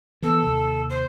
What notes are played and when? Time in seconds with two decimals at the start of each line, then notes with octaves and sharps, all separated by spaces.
0.22 E3 B3 A4
0.43 D#2 C3
0.89 C5